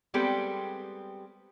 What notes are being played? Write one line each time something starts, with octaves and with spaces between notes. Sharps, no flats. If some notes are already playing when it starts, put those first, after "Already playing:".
G3 G#3 B3 C4 G4 A4